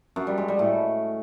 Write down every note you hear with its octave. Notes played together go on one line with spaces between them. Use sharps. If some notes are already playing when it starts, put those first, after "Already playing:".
F#2
G3
G#3
G3
A2